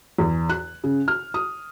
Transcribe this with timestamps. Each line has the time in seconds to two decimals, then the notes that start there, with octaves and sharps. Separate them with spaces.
0.18 E2
0.49 F#6
0.84 C#3
1.08 F6
1.34 D#6